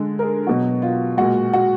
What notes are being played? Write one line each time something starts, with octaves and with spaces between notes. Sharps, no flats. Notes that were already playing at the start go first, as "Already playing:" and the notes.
Already playing: D3 G#3
A#4
G#4
B2 F#3 F#4
F4
A#2 G#3 F#4
F#4